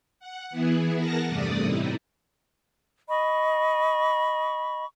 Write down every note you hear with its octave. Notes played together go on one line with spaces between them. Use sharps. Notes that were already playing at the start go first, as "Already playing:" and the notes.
F#5
E3 B3 E4 G#4
A#4 F#5 A5 A#6
E2 G2 C3 A3 D5 D#6
A2 C3 D#4 E4
D#5 B5 C#6